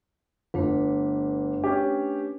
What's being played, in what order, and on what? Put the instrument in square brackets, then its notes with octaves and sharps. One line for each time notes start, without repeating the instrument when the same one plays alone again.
[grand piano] G1 [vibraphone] A3 D4 B4
[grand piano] C#4 G4